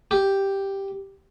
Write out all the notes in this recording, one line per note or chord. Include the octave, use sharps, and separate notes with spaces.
G4